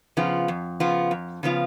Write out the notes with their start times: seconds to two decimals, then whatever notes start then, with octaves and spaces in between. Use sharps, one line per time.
0.17 C#3 F3 B3 F4
0.48 F2
0.80 C#3 F3 B3 F4
1.11 F2
1.43 C#3 F3 B3 F4